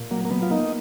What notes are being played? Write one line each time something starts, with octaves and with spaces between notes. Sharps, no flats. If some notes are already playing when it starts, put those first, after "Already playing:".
Already playing: A#2
F#3 A#3
A#3
F#3 B3
F4
A#3 D#4